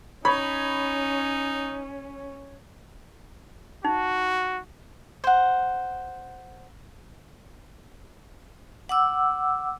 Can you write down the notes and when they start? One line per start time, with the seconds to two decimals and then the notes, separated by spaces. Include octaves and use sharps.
0.25 C#4 D#4 C#5 B5
3.85 D#4 F#4
5.24 C5 F#5
8.89 F#5 D6 E6